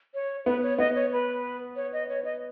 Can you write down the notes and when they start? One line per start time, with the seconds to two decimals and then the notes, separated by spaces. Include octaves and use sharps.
0.14 C#5
0.46 B3 B4
0.63 C#5
0.78 B3 D#5
0.95 C#5
1.12 B4
1.76 C#5
1.93 D#5
2.09 C#5
2.25 D#5